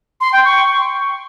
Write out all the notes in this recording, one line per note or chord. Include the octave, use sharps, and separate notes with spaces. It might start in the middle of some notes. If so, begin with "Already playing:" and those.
C6
G5
C#6